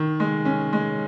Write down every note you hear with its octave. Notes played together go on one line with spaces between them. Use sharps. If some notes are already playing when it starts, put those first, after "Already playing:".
Already playing: D#3
G#3
C#4
G#3